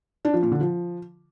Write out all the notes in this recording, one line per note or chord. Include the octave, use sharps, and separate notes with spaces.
D4
F3
A#2
D3
F3